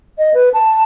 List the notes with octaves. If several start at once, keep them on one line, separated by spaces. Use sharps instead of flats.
D#5
B4
A5